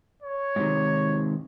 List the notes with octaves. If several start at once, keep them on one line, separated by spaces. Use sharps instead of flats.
C#5
G#2 C3 D#3